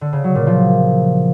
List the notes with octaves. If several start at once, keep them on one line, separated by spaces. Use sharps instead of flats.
D3
C#3
F#3
A#2
F3